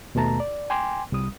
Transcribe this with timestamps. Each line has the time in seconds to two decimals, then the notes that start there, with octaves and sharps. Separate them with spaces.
0.15 D#2 B2 A3 A5 A#5
0.40 D5
0.70 G5 G#5 C6 D6
1.12 C2 G3 D#6